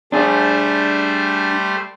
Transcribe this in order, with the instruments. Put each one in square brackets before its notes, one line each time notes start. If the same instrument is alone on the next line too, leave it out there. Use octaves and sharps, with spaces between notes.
[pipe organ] G3 A3 C5 [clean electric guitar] D4 G#4